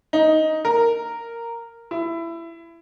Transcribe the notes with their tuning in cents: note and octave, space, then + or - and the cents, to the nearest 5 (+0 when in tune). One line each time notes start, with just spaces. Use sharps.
D#4 +10
A#4 -5
E4 +20